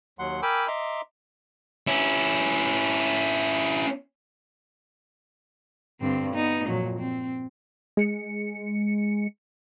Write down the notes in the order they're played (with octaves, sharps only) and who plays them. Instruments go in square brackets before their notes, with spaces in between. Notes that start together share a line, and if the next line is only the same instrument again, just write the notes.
[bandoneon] D#2 F#3 F#5 C6
A#4 G5 G#5 B5 D6 E6
D#5 E5 A#5 C6 D6
[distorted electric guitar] C#4 E4
[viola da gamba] G2 D3 C4
B3 D#4
F2 A#2 F#3
C4
[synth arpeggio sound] G#3 C#7